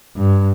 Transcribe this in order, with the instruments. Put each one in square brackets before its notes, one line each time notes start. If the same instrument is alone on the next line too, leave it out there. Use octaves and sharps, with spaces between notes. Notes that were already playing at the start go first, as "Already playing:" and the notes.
[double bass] G2